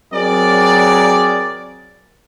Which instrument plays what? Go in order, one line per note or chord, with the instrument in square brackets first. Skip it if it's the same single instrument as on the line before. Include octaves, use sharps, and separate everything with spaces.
[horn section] F#3 C4 G#4 A#4 D5